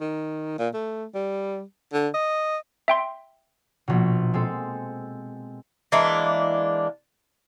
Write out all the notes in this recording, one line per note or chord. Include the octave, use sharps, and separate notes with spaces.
D#3
A#2
A3
G3
D3
D#5
E5 G5 C6
A#1 B2
G#3 C4 A4
E3 G#3 A#3 D4